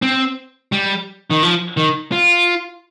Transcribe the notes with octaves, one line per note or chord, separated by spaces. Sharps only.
C4
G3
D#3
F3
D#3
F4